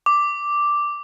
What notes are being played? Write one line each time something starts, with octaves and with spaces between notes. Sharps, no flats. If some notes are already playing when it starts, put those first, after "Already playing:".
D6